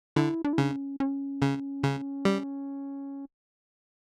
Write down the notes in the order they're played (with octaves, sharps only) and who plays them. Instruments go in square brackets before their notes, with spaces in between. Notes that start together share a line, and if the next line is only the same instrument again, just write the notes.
[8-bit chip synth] D3 [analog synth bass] E4
[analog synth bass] D4
E4
[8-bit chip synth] C#3 [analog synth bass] D4
[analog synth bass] C#4
C#4
[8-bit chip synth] C#3
C#3
G3